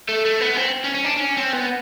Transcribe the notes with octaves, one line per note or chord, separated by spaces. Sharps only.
A3
A3
B3
C4
C#4
C#4
D4
D4
C#4
C4
B3